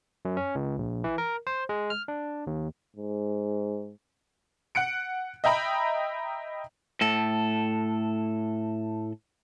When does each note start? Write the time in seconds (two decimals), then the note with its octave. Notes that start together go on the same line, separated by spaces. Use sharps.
0.25 F#2
0.37 C#4
0.55 C#2
0.78 A#1
1.04 E3
1.18 A#4
1.47 C5
1.69 G#3
1.90 F6
2.08 D4
2.47 D#2
2.96 G#2
4.75 F#5 F#6 C#7 D7
5.44 D#5 E5 G5 A#5 B5
7.01 A2 A4